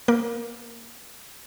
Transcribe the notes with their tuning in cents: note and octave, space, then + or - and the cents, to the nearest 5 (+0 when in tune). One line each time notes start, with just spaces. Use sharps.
A#3 +0 A#4 +0